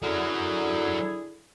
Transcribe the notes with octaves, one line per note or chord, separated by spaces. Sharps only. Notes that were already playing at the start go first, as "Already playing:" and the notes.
D3 F#3 E4 G#4 A#4